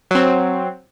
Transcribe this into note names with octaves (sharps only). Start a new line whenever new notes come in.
F#3 C4